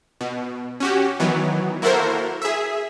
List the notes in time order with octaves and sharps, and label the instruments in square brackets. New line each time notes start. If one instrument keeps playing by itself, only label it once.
[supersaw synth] B2
C#4 F#4 G4
D#3 E3 F#3 B3
A#3 E4 F#4 A4 A#4 C5
G#4 E5